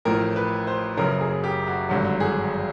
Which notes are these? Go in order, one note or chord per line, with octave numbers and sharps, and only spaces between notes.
A1 A2 F3 A#4
B4
C5
F#1 F#2 C#3 A#4
G#4
G4
F#4
G#1 G2 D3 F#3
G#4